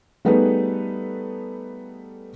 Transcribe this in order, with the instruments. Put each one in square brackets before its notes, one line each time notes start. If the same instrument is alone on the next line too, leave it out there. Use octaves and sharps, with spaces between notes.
[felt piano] G3 A3 B3 D#4 G#4 B4